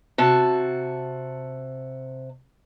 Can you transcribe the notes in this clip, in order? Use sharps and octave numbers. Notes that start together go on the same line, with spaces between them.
C3 F#4 A5